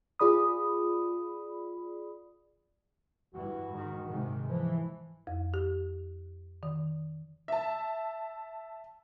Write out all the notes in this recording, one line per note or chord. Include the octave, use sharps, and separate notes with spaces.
F4 G#4 D5 B5 D#6
G2 E3 F#4
G#2 D#3
G#2 C3 D#3
E3 F3
F2
G4
D#3
E5 A5